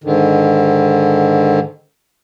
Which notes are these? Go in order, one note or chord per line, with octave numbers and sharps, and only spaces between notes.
G#2 D3 D#3